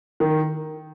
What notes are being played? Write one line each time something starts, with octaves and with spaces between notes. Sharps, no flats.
D#3